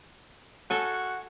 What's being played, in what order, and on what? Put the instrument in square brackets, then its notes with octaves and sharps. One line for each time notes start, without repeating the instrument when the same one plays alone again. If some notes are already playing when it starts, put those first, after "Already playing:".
[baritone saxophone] F#4 [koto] A4 G#5